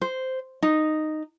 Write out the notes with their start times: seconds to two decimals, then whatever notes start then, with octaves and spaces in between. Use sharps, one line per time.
0.02 C5
0.63 D#4